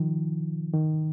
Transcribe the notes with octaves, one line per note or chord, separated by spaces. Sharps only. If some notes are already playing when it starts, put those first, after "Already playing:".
Already playing: D#3 F3
D#3